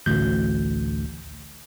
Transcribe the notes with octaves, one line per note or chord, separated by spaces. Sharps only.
A1 D2 G6